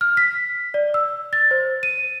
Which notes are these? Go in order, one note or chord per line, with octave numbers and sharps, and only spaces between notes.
F6
B6
D5
E6
A6
C5
D#7